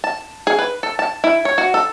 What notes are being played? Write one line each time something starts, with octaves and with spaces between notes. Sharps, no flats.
A5
G#4
B4
A4
A5
E4
C#5
F#4
A4